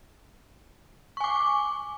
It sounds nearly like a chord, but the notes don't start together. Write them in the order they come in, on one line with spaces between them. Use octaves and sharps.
C#6 G#5 D6